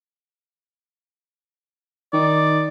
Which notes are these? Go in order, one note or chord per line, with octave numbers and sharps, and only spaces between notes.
D#3 D5